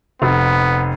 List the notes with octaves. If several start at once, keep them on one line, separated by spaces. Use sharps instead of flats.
F1 B3